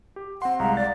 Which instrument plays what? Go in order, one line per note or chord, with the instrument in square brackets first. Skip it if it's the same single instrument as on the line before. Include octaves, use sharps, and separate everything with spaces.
[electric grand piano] G4
[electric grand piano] C4 C6 [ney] F#5
[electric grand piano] C2 G#3 [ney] F5 [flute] A#5
[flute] D5 [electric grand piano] A6